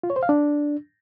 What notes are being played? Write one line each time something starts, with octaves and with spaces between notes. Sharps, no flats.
F4
C#5
C5
F5
D4